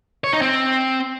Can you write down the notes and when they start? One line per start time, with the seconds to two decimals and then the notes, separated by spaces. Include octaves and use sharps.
0.24 C#5
0.33 D#4
0.42 C4